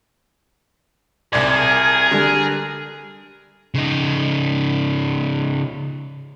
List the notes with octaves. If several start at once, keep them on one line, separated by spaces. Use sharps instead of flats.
C2 G#2 D5 G#5
G#4 A#4
D3 G3
C#3 D#4